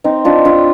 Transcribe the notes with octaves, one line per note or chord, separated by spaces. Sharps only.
C4 D#4
D4 F4
D4 F4